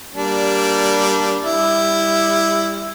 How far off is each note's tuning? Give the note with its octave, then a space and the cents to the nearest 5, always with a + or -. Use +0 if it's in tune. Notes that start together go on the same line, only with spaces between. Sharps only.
G3 -10 A#3 -5 D4 -15
G3 +25 E4 +0